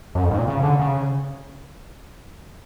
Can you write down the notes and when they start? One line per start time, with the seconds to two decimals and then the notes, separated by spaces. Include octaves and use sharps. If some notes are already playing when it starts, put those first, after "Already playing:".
0.15 F#2
0.23 F2
0.31 G#2
0.39 A#2
0.48 C#3
0.63 D3
0.79 C#3